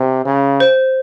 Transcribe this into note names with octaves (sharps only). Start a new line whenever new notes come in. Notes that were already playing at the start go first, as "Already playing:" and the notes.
Already playing: C3
C#3
C5